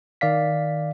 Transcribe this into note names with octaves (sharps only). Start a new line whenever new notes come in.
D#3 D5 F5 B6